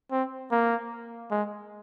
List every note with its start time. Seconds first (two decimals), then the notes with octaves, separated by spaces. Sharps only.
0.11 C4
0.51 A#3
1.31 G#3